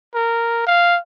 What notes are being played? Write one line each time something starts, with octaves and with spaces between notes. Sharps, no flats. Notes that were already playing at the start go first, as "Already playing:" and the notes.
A#4
F5